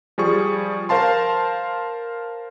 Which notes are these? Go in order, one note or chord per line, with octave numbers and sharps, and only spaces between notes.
F3 G3 G#4 C#6
A#4 C5 F5 A5 C6